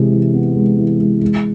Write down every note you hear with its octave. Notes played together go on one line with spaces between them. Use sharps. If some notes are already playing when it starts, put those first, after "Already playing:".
Already playing: C3 E3 G#3
E3
B3
G#3
E3
G#3
G#3